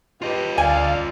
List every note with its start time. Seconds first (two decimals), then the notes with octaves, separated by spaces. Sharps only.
0.22 F4 G4 B4 D#5
0.58 D2 D5 F5 G#5